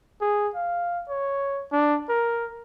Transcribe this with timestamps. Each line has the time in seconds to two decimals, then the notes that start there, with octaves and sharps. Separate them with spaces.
0.21 G#4
0.55 F5
1.09 C#5
1.72 D4
2.09 A#4